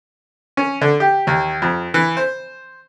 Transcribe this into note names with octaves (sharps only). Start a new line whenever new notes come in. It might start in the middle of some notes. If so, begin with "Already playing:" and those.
C#4
D3
G4
D#2
F2
E3
C5